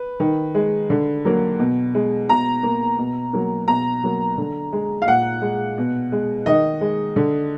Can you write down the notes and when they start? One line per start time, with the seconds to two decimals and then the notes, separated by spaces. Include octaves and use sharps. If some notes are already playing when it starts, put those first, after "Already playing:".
Already playing: B4
0.20 D#3
0.55 G#3
0.90 D3
1.25 F#3 A#3
1.59 B2
1.95 G#3
2.29 B2 A#5
2.63 A#3
2.99 B2
3.33 F#3 A#3
3.67 B2 A#5
4.04 F#3 A#3
4.38 D3
4.73 G#3
5.02 F5
5.07 A#2 F#5
5.42 G#3
5.78 B2
6.12 G#3
6.46 D#3 D#5
6.81 G#3
7.16 D3